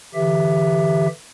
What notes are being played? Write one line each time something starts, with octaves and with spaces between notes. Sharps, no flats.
D3 E3 G4 E5